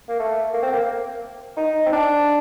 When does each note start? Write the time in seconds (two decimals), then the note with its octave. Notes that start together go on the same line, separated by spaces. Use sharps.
0.09 A#3
0.20 A3
0.54 A#3
0.63 C4
0.72 A#3
1.57 D#4
1.86 C4
1.93 D4